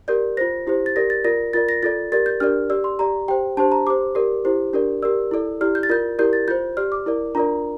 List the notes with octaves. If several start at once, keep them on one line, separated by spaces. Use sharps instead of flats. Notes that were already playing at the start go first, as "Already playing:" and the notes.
G4 A#4 D5 G6
F4 C5 A#6
E4 G4 C5
A6
G4 A#4 D5 A#6
A6
F4 A#4 D5 A#6
F4 A#4 D5 A6
A#6
F4 A4 D5 A6
G4 A#4 D5 A6
G6
D4 G4 A#4 D5 F6
G4 D5 E6
C6
G4 D5 A#5
G4 C5 G5
D4 G4 C5 A5
A#5
G4 C5 D6
G4 A#4 D5
E4 G4 C5
D4 G4 A#4 D5
G4 A#4 D5 E6
E4 A4 D5
E4 G4 D5 F6
G6
A6
F4 A#4 D5 G6
E4 G4 A#4 D5 G6
A6
F4 C5 G6
G4 D5 F6
D6
E4 A#4 D5
D4 F4 A#4 D5 A#5